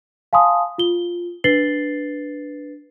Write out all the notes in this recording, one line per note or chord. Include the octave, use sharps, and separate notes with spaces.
F5 G#5 A5 C6 D#6
F4 G7
D4 B4 A6 C7 F#7 G7